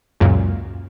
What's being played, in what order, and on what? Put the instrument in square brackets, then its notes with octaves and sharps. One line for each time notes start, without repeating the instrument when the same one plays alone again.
[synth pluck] C#2 F#2 A#2